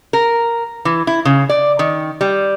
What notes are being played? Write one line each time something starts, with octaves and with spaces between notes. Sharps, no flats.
A#4
E3
E4
C#3
D5
D#3
G3